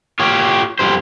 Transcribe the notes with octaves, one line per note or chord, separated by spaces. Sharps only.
F4 G4 C#5
F2 G#2 G3 G4 C5